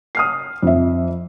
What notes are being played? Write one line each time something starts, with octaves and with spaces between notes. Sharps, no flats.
D#6 F6 C7
F2 E5